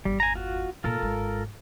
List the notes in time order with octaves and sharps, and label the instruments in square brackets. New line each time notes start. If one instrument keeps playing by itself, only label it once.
[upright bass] G1 E2 [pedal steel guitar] G3
[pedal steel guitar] G#5 A#5
F4 F#4
[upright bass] A#2 D#3 [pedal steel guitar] F4 A4 A#4
[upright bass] G#1 G#2